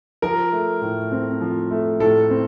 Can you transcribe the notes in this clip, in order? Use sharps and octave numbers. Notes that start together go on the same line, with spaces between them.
F3 A#4
A3
A2
C4
F3
A3
A2 A4
C4